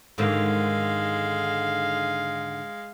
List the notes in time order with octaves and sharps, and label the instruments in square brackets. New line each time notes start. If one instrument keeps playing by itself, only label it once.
[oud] G#2 D3 D#3 [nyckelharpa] G#3 F5